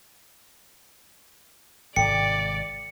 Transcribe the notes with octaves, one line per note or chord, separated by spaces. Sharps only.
G#1 G#2 C3 A4 D5 G5 C#7